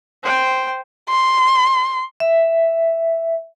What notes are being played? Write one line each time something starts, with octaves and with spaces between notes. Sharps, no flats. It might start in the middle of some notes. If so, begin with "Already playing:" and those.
C5 G5
C6
E5